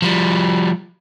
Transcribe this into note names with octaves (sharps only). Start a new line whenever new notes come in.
F3 G3